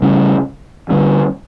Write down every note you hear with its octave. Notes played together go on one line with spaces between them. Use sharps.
C#3 G3 C#4
D3 G3 C#4